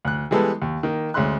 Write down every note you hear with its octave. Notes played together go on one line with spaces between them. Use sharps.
D2 F#6
E3 G3 G#3 B3 A4
D#2
D#3 A#3
D2 G#3 C#4 E5 C6 F#6